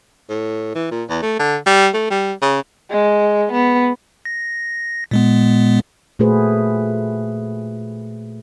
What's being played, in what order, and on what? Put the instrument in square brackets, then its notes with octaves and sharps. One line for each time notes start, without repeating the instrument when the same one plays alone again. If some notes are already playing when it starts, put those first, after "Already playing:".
[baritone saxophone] A2
E3
A#2
E2
A3
D3
G3
A3
G3
C#3
[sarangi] G#3
B3
[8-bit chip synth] A#6
A#2 G#3 B3
[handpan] A#2 A3 F#4 G#4 B4 C5